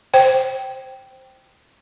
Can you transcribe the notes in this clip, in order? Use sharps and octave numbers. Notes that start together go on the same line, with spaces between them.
C5 G5